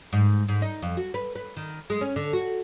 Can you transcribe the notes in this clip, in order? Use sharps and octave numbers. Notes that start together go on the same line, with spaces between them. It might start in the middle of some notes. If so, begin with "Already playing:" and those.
G#2
G#2
D#4
F2
F#4
B4
B4
D#3
G#3
C#4
D3
F#4